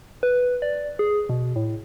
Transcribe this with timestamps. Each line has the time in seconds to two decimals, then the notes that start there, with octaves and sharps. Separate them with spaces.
0.23 B4
0.62 D5
0.99 G#4
1.29 B2
1.56 A2